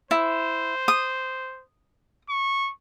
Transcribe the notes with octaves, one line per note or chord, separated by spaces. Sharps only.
E4 C5
D#6
C#6